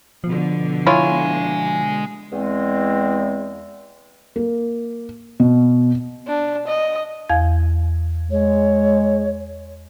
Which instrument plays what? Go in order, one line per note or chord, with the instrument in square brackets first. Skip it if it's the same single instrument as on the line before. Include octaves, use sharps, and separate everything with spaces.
[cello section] B2 D3 [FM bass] F3
[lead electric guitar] G#3 G#5 [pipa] E4 F4 C#5
[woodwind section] E2 G#3 C4
[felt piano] A#3
B2
[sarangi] D4
D#5
[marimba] E2 F5 G#6
[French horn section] G#3 [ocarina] C#5